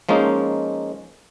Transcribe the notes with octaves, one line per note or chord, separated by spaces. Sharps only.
F3 G#3 A#3 C#4 D#4